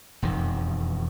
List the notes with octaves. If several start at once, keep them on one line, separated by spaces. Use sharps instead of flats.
E1 F2 D#3